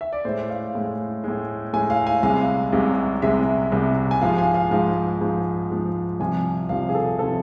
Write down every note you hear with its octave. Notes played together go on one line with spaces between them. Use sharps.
E5
D5
A2 G#3 C5
F5
A2 G#3
A2 G#3
A2 G#3 G#5
F5
G#5
C2 C3 G#3 F5
C2 C3 G#3
C2 C3 G#3 E5
C2 C3 G#3
G#5
G#2 F3 G#3 F5
G#5
F5
G#2 F3 G#3 F5
G#2 F3 G#3
G#2 F3 G#3
C2 C3 F3 G#5
C2 C3 F3 F5
G#4
A4
C3 F3 A4